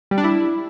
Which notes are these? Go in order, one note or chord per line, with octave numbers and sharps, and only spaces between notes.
G3
D4
E4